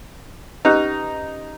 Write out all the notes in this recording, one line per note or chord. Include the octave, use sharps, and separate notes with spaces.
C#4 D#4 G4 B4